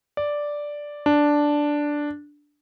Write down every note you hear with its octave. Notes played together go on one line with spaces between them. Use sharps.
D5
D4